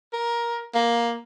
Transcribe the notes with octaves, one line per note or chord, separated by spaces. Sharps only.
A#4
A#3